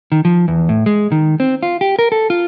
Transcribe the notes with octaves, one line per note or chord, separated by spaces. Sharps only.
D#3
F3
E2
A2
G#3
D#3
C4
F4
G4
A#4
A4
F4